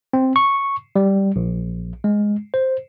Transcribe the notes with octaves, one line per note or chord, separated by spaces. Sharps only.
C4
C#6
G3
A#1
G#3
C5